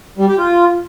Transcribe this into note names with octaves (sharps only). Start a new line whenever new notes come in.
G3
G4
F4